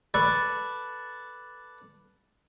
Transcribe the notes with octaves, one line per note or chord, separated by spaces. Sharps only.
A4 B4 D5 A5 C#6